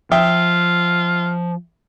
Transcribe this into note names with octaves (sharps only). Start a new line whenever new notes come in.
F3 F4 E5 G5 D#6